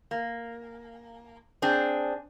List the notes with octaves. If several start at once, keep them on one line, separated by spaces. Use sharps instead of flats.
A#3
C4 D4 G#4